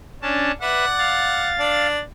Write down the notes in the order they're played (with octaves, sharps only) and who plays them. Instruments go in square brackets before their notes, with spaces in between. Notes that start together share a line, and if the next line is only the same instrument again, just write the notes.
[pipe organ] C#4 D4 A5
[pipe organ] B4 E5 [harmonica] D5 F#5
[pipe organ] F5 A6
[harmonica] D4